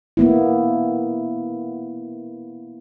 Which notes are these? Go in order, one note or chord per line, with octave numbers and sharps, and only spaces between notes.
A#3 B3 E4